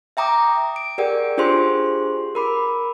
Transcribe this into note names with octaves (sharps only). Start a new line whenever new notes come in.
E5 G5 A#5 D6 D#6
D7
G4 G#4 A#4 D5 F#5 G5
D4 F4 G4 G#4 C5 C6
A#4 B5 D6